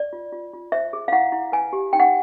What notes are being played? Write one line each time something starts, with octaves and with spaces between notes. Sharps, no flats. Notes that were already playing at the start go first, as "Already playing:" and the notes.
Already playing: D5
F4
F4
F4
C5 E5
G#4
F5
E4 F#5
E4
B4 G#5
G4
D#4 G5
F#5